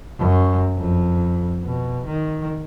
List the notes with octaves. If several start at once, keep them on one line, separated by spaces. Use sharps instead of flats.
F#2
F2
B2
D#3